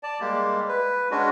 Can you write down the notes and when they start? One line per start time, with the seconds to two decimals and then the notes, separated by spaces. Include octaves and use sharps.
0.03 D5 A5
0.20 G3 G#3 A#3 G4
0.69 B4
1.11 G#3 C#4 D4 F#4